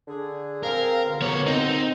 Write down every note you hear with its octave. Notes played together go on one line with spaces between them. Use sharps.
D3 G#4
C4 G#4 A#4 F5
C#2 B2 D3
B3 A#4 C#5
C4 D#4